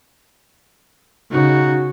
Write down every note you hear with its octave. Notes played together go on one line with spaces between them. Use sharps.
C#3 D#4 F#4